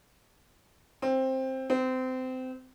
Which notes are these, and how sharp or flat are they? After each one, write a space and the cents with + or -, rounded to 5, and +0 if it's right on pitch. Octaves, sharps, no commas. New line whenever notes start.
C4 +10
C4 -25